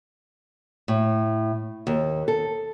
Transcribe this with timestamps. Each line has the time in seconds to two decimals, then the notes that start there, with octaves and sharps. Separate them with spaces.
0.88 A2
1.87 D#2
2.28 A4